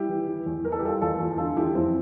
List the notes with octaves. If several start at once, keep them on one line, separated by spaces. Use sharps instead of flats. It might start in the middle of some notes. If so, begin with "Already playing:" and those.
Already playing: G3 E4 G4
E3
E3
E2
E3 A#4
A4
G4
G3 F4 A4
E2 F4 A4
E2
D3 F4 A4
E2 E4 G4
F2 C4 E4